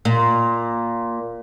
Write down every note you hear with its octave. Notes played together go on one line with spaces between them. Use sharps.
A#2